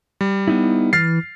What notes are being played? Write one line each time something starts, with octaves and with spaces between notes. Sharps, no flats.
G3
B3 D#4 E4
E3 F6 A6 C7